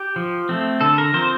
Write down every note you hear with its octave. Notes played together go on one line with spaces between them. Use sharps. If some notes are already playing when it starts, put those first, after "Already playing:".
Already playing: G4
F3
A3 C4
D3 A4
A#4
F3 C4 C5